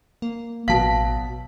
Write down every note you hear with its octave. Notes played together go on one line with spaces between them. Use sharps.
A#3
A1 B2 F#3 F5 A5 B6